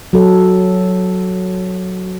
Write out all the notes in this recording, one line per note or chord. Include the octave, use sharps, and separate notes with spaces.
F#3 A4